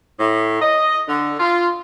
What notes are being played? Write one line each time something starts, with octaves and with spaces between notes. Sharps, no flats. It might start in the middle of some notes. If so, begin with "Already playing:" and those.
A2
D#5
D3
F4